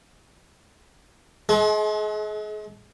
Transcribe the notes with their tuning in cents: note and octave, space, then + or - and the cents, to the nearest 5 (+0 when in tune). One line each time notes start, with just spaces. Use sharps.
G#3 +35 A4 -40